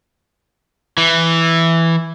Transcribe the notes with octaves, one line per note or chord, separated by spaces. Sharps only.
E3